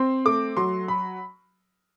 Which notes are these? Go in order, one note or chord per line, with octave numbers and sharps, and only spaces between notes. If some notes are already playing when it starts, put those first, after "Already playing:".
Already playing: C4 C6
A3 D6
F#3 C6
B5